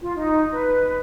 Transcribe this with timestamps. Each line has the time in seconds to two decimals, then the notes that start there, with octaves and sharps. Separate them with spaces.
0.01 F4
0.16 D#4
0.52 B4